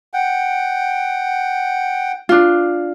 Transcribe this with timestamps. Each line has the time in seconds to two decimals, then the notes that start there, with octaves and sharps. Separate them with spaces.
0.14 F#5 G5
2.29 D4 F4